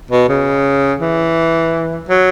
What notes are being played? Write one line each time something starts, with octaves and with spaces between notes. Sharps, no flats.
B2
C#3
E3
F#3